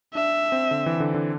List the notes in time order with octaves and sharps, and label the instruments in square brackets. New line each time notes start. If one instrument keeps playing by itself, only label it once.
[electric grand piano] D4 [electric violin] E5
[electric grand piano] C4
D3
E3
D3
D3